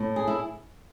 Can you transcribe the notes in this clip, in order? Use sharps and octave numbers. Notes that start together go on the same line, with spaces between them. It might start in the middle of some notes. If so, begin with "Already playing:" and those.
Already playing: A2
G#4
E4